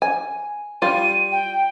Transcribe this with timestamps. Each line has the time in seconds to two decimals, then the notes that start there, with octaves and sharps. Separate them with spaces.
0.02 G#5
0.82 G3 F4 D#7
1.32 G5